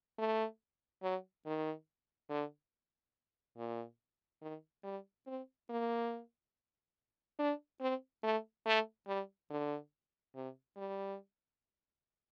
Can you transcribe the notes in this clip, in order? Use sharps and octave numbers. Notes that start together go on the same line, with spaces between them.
A3
F#3
D#3
D3
A#2
D#3
G3
C4
A#3
D4
C4
A3
A3
G3
D3
C3
G3